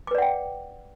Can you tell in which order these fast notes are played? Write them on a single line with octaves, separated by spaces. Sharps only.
D6 B4 D5 F#5 G5